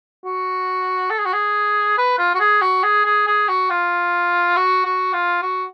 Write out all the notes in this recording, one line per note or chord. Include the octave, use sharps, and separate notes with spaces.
F#4
A4
G#4
F#4
G#4
B4
F4
F#4
G#4
F#4
G#4
G#4
G#4
F#4
F4
F#4
F#4
F4
F#4